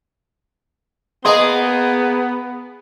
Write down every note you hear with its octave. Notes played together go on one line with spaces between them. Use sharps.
A#3 B3 G#4 D#5 C6